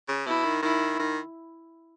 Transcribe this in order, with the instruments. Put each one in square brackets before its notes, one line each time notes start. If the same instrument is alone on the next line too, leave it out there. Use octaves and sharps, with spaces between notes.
[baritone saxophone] C#3
[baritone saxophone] B2 [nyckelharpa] E4
[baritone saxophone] D#3
[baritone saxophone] D#3 [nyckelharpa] E4
[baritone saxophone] D#3